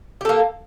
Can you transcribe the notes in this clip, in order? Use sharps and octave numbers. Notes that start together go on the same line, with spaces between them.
A#3 G4 A4